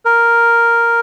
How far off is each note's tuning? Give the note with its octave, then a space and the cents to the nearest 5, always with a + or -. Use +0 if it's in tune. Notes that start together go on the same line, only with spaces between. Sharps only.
A#4 +0